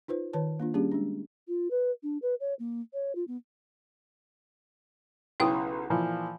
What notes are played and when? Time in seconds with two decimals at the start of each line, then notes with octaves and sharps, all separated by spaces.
0.08 D#4 F4 B4 C5
0.33 D#3 B4 C#5 A5
0.60 A#3 D4 F4
0.74 G3 A#3 C#4 D4 G4 G#4
0.92 G#3 D4
1.48 F4
1.71 B4
2.03 D4
2.22 B4
2.40 C#5
2.59 A#3
2.93 C#5
3.15 F4
3.28 B3
5.40 B1 C#3 E4 G5 D#6
5.90 A#2 E3 F3